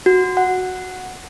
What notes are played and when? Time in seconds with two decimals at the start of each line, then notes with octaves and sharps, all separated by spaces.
0.06 F#4
0.37 F#5